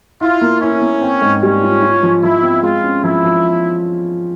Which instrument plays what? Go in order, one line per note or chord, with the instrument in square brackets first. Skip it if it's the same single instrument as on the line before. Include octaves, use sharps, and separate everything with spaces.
[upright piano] E4 [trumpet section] F4
[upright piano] A#3
[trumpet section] C#4 [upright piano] E4
[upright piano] A#3
C4
G#2
[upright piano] G3 [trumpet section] C#4
[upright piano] F4
F4
F3
[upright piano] F3 [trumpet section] E4
[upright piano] C4
[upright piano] G#3 [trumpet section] F4
[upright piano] C#4
[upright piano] F3 [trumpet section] E4
[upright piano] F3